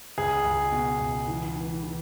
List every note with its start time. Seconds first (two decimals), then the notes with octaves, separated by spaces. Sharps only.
0.18 C#2 G#4
0.45 C#2
0.72 B2
1.00 C#2
1.28 E3
1.56 E3
1.83 E3